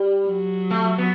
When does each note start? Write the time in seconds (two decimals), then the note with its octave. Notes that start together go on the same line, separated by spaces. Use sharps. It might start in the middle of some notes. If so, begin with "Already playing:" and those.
Already playing: G3
0.28 F#3
0.71 A3
0.98 B3